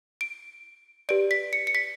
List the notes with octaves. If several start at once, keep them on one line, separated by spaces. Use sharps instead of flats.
D7
G4 B4 D5 D7
B6
C#7
C#7
B6